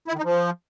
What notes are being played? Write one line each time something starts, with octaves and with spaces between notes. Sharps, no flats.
E4
D#3
D#4
F3